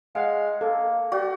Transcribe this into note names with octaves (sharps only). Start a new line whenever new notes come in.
G#3 F5 F#5
A#3 A4
G3 F#4